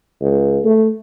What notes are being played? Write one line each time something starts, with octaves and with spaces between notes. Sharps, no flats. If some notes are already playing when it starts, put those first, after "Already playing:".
C#2
A3